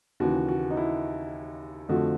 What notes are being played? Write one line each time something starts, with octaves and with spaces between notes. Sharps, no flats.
D#2 C#3 E3 F#4
F#4
D#4
E4
F2 D3 F3 A3 F#4